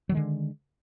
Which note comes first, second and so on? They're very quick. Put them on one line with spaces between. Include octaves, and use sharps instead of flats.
F#3 D#3 G#3 D3